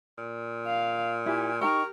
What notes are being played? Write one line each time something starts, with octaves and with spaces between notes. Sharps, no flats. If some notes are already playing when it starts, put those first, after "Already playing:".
A#2
F5
E4 G4 G#5
D#4 G4 A#4 G5 A#5 C#6